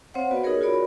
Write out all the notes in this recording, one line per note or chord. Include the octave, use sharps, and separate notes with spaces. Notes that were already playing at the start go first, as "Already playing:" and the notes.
C4 C5 C#5 F5 F#5
B3 F#4 B4 D5 D#5
D#4 G4 G#4 A#4 C#5
F4 F#4 A#4 C#5 D5 B5